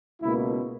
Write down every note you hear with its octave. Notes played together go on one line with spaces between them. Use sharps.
C#2 B2 A#3 E4